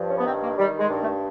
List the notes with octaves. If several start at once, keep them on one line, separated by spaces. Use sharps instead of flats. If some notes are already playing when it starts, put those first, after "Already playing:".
Already playing: G2 F3
C#4
B3
D#3 C4
A#3
D#3 G3
G#3
G2
A3